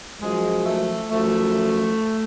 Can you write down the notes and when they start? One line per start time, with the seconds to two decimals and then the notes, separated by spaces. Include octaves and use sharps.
0.20 F#2 F3 G#3
0.65 A3
1.11 F#2 F3 A3